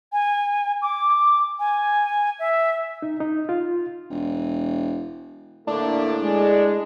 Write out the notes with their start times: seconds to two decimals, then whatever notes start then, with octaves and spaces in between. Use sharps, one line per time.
0.12 G#5
0.82 D6
1.59 G#5
2.39 E5
3.02 D#4
3.21 D#4
3.49 F4
4.10 E1
5.67 A2 D3 A3 A#3 D4
6.20 G#3